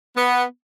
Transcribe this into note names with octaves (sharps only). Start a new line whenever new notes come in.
B3